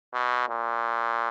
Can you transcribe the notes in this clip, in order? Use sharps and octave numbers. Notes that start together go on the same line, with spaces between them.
B2
A#2